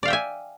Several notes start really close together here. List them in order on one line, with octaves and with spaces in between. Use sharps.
D5 F5 G5 E5 G#5